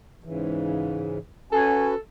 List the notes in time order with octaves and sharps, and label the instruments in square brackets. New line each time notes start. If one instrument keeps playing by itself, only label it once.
[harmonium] G#2 C#3 E3
[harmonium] C#4 F#4 B4 [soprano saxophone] A4 [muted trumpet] G#5